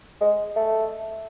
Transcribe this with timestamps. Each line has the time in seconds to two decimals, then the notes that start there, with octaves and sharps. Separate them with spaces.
0.21 G#3
0.56 A3